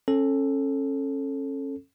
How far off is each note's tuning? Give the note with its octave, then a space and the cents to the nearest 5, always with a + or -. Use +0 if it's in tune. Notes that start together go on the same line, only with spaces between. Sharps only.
C#4 -30 A4 +0